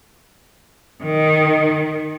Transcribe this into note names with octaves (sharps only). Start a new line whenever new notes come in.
D#3